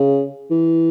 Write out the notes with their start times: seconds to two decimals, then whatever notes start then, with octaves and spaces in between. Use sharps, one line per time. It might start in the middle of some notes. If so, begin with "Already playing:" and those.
Already playing: C#3
0.51 E3